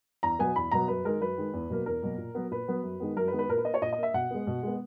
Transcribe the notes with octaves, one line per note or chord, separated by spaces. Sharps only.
E2 A#5
B2 F#3 B3 G#5
E2 B5
B2 F#3 B3 A#5
F#2 B4
D#3 G#3 A#4
F#2 B4
D#3 G#3
E2
B2 F#3 A#3
E2 A#4
B2 F#3 A#3
A#2
F#3 B3
A#2 B4
F#3 B3
F#2
D#3 G#3 B3
F#2 A#4
B4
D#3 G#3 B3
B4
A#2 A#4
B4
A#3 D#5
C#5
A#2 D#5
D#5
A#3
E5
B2 F#5
G#3 B3
B2
G#3 B3